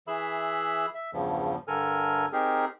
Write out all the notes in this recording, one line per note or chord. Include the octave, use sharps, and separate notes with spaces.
E3 G#4 E5 B5 E6
E5
E2 G2 C#3 F3
G2 D3 A4 A#4 G#5 F6
C4 D#4 G4 G#4 A#4